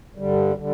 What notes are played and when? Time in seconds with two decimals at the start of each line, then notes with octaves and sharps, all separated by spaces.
0.16 G2 D3 G3
0.57 D3 G3